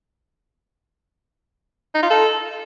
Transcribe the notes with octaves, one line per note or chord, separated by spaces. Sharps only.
D#4
F4
A4